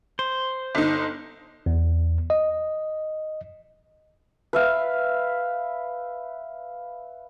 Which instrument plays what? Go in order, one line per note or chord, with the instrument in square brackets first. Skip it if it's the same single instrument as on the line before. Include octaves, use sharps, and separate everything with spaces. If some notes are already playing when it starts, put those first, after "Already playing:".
[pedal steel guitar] C5
[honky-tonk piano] G1 D#4
[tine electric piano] E2
D#5
[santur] B4 E5 F5